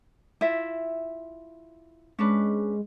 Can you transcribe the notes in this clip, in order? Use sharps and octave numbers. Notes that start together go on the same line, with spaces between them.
E4 F4 E5
G#3 C#4 D4 B4